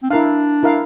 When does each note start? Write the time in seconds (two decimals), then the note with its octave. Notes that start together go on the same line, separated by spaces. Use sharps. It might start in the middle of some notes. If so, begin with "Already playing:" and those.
0.03 C4
0.10 D4 E4 A#4 F5
0.63 E4 A#4 F5